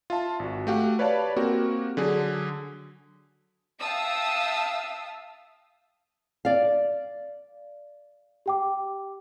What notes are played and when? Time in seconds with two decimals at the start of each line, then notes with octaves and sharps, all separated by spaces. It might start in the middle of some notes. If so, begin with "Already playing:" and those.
0.10 F4 E5 A5
0.39 G#1 F#4
0.67 A3 F#4 G4 F5 F#5
0.99 B4 C#5 D5 F5 A5 B5
1.36 A#3 C4 F#4 G4 A#4
1.97 D3 F#3 G#4
3.82 E5 F5 G5 A5 D#6 E6
6.45 D5 F5
8.46 G4 G5 D6